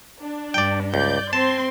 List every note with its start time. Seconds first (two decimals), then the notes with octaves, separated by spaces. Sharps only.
0.20 D4
0.54 G2 D5 G5
0.94 C#2 D5 G6
1.33 C4 C5 A5 C6